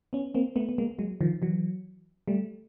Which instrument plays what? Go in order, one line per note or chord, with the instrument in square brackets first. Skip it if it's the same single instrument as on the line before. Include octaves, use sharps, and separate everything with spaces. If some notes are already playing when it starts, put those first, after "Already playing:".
[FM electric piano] B3 C#4
A#3 C4
A3 B3
B3
G#3 A#3
F#3 G#3
D#3 F3
E3 F#3
G3 A3